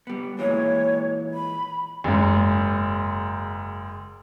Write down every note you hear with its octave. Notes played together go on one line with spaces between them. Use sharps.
G3 B3
A#2 E3 G#3 C#5
B5
F#1 G#2